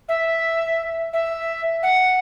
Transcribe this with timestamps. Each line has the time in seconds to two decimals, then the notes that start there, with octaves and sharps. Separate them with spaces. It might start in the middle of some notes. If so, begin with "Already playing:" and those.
0.08 E5
1.13 E5
1.83 F#5